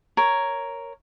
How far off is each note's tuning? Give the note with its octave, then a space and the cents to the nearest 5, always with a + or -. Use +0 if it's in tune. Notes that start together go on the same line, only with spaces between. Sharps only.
A#4 +0 C#5 +5